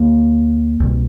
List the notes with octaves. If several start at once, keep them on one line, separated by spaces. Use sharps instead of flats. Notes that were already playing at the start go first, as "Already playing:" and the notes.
Already playing: D2 D3 A#3
C2 B2